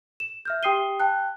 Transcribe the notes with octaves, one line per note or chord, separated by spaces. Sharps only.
E7
E5 F6 G6
G4 G5 D#6 C7 D#7 G7
G5 A5 F#6